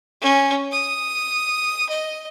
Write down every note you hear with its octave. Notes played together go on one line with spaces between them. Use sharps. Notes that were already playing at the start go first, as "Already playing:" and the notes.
C#4
D#6
D#5